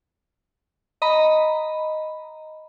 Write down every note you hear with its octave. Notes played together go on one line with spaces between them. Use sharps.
D#5 A#5 B5